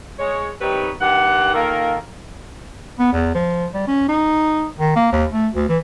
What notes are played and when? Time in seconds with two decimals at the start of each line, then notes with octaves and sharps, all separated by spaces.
0.19 G#3 C#5
0.61 D#3 G3 C4 D#4 B4 C#5
1.00 G2 D#3 G4 F#5
1.54 D#3 A#3 F4 A4 A#4
2.99 B3
3.13 E2
3.35 F3
3.74 G3
3.88 C#4
4.09 D#4
4.79 D#3
4.96 A#3
5.12 D#2
5.31 A3
5.54 D2
5.69 E3